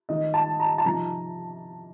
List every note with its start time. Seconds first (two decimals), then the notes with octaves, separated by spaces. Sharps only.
0.09 D#3 A3 D#4 D#5
0.34 A5
0.60 A#5
0.78 A5
0.85 C3 F3 C4 D#4 A#5